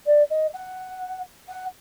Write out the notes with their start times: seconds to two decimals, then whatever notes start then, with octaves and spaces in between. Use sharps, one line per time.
0.06 D5
0.30 D#5
0.53 F#5
1.48 F#5